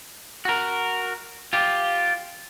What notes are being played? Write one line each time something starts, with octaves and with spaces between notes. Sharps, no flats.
F#4 A#4
F4 G4